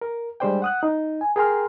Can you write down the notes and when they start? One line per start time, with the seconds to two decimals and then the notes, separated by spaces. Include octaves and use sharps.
0.02 A#4
0.40 G3 G#3 D4 C5 D5 G5
0.62 F#5 D#6 F#6
0.83 D#4
1.21 G#5
1.36 G#4 A#4 G5 A#5 C6 F6